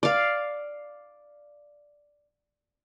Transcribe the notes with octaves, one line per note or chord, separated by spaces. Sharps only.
D5 F5